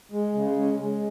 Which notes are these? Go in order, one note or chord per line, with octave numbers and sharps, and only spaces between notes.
G#3
C#3
G#3 C#4
G#3